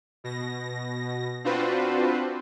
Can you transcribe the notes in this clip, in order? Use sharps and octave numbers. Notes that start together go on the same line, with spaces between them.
B2 A#6
C4 D4 F4 F#4 B4 C5